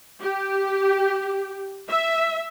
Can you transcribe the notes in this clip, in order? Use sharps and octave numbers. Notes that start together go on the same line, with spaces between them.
G4
E5